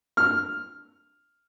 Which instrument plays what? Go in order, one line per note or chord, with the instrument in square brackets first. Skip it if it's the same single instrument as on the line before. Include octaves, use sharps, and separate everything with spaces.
[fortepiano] F6